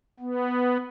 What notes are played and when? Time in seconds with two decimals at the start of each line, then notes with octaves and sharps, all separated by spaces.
0.20 B3